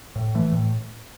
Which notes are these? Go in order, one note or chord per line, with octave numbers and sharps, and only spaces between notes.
A2
E3 A3
A2